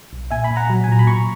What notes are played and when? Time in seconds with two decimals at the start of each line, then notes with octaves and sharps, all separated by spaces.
0.13 B1
0.31 A#2 E5 G#5
0.44 G#5 B5
0.51 A#2
0.56 F#5 A#5
0.70 F#3
0.84 G#5
0.88 A#2 A#5
0.99 B5
1.07 A#2 A#5 C#6